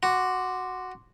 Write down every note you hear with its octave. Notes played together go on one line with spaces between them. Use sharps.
F#4 C6 D6